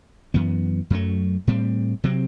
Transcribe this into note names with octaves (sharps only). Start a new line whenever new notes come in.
F#2 E3 B3
F#2 F#3 A3
A2 G3 C4
C3 F#3 C4